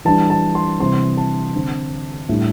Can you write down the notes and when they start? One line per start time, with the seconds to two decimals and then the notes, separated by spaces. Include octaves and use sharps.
0.05 E3 G3 D4 A5
0.30 A5
0.55 C6
0.79 C3 E3 G3 C4 C6
1.17 A5
1.55 D3 C4
2.29 A2 G3 D4